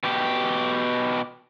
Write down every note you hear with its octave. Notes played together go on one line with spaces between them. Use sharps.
B2 G4